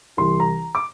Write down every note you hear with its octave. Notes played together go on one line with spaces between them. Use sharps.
C2 C3 E3 C6
A#5
D6